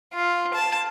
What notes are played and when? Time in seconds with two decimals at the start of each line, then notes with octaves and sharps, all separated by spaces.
0.13 F4
0.54 A5